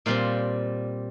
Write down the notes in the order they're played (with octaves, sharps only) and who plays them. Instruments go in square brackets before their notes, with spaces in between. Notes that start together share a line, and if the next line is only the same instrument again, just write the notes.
[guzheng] A#2 G3 C4 F5